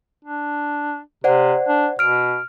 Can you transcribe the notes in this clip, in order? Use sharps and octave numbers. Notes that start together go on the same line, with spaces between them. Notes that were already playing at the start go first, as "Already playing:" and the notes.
D4
C3 C5 D5 F#5
D4
B2 F6 D7